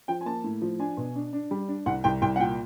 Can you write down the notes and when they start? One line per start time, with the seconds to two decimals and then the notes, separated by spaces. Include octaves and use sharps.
0.08 F3 G5
0.21 G#5
0.26 A#3 A5
0.44 A2
0.62 F3
0.79 D4 G#5
0.97 B2
1.16 D4
1.33 D4
1.51 G3
1.68 D4
1.86 C2 F#5
2.04 C2 G5
2.22 C2 G5
2.36 F#5
2.39 A#2 G5